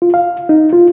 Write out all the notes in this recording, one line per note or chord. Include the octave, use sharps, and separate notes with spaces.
F4
F5
D#4
F4